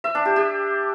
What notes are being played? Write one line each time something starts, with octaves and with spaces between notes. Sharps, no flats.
E5
D4
G4
G4